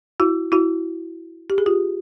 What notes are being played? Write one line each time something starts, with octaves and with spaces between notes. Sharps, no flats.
E4 F#4
E4 F#4
G4
G#4
F4 G4